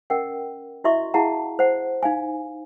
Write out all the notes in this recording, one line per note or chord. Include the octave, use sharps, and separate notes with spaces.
C#4 A#4 D#5 F#5 G5
E4 F#4 D#5 E5 C6 C#6
E4 G#4 F5 F#5 A5 A#5
C5 F#5
D#4 F5 G#5